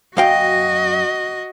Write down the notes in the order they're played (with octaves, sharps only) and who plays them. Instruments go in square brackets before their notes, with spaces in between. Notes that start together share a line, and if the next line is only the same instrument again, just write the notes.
[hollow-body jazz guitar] F#2 F5 G5 [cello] F#4 D#5